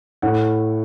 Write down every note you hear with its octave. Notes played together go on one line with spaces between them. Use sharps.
A2 F#5